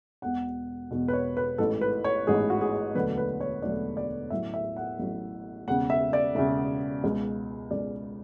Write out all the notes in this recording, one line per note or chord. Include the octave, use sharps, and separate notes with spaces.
E1 E2 B2 F#5
E1 E2 B2
B4
C#5
B4
A1 G#2 E3 A4
B4
C#5
A1 G#2 E3 G#4
F#4
G#4
E1 D2 D3 F#3 A3 B4
B4
C#5
E1 D2 D3 F#3 A3 D5
D5
A1 A2 F#3 E5
E5
F#5
A1 A2 F#3
E1 E2 C#3 F#5
E5
D5
E1 E2 C#3 E5
C#2 B2 G#3
C#2 B2 G#3 D5